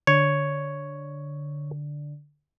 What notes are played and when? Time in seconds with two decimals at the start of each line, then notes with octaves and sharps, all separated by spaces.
0.07 D3 C#5